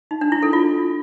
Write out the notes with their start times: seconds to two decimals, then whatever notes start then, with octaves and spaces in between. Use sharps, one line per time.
0.11 D#4
0.21 D4
0.32 E4
0.43 A4
0.53 F4